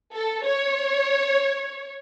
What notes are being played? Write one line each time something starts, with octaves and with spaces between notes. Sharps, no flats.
A4
C#5